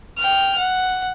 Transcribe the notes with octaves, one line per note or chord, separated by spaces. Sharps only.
G5 F6
F#5